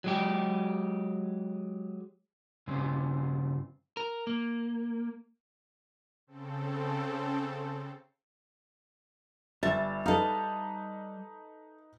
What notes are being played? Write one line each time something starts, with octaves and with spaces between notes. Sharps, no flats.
F#3 G#3 G4
G2 C#3 C4
A#4
A#3
C#3 C4 A4
G1 G3 E5 A6
D#4 A4 B4 F5